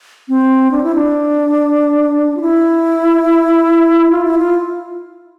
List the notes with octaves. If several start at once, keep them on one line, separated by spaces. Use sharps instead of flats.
C4
D4
E4
D4
F4
E4
F4
E4
F4